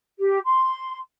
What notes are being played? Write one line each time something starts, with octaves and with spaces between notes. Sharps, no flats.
G4
C6